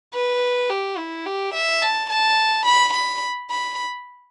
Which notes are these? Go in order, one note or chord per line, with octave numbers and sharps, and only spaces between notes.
B4
G4
E4
G4
E5
A5
A5
B5
B5
B5